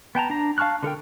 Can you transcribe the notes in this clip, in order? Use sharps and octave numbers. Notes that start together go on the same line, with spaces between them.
B3 G5 A5 A#5
D4 A#5
F5 A5 C#6 F6 F#6
D3 A4 A#4 G5